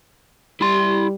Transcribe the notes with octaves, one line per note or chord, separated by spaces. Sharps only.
G3 E4 C6